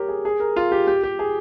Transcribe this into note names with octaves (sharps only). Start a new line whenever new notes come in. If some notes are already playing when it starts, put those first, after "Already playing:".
Already playing: G4 A#4 C#5
G#4
G#4
A#4
F4
G4
G4
G4
G#4